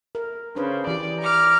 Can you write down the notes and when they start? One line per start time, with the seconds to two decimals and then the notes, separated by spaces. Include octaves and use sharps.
0.15 A#4
0.56 C#3 D4 B4 C5
0.87 E3 G4 D5
1.20 A#5 D6 F6